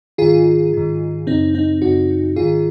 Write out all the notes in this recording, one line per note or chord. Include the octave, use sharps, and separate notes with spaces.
G#2 D#3 F4 G#4
G#2 D#3
F#2 C#3 C4 D#4
C4 D#4
F#2 C#3 D#4 F#4
G#2 D#3 F4 G#4